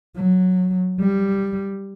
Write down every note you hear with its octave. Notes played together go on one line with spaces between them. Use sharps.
F#3
G3